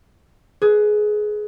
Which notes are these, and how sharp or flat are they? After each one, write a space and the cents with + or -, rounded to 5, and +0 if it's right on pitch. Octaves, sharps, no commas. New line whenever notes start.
G#4 +20 B4 +0